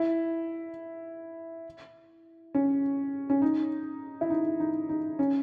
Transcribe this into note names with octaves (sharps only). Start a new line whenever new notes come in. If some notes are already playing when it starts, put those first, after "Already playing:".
Already playing: E4
C#4
C#4
D#4
E4
D#4
D#4
D#4
C#4